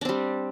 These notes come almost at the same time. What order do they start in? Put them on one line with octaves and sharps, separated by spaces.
D4 C4 G3